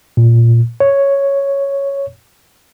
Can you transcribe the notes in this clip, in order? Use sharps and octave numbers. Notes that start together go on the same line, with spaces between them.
A#2
C#5